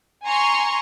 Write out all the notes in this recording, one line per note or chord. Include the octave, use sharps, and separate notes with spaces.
G#5 A#5 C6 C#6